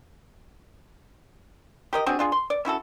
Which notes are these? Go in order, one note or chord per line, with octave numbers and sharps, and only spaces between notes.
G4 A#4 D#5
C4 D4 F#4 G#4
D4 F4 G#4
C6
D5
C#4 E4 F#4 A4